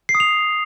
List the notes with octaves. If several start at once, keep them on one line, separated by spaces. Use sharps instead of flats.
C7
D#6
F7